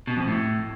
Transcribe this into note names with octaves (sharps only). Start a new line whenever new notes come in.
B2
F2
A2